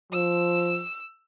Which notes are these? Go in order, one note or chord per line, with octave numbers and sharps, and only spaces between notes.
F3 E6